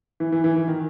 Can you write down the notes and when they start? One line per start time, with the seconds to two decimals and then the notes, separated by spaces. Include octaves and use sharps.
0.20 E3
0.32 E3
0.44 E3
0.56 E3
0.68 D#3